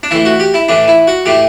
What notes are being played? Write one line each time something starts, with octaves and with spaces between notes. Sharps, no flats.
D4
A2 E3 E4
F#4
G4
E4
A2 E3 D4
E4
F#4
A2 E3 G4